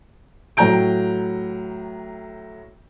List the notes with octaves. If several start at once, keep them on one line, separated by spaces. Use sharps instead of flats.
A2 F#3 G5 A#5 G6 D7